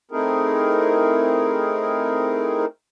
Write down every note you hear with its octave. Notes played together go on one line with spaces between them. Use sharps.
A3 C4 D#4 E4 G#4 A#4